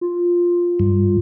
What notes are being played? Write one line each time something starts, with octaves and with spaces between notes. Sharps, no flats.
F4
G2